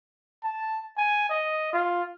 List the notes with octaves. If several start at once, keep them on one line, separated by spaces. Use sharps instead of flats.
A5
G#5
D#5
F4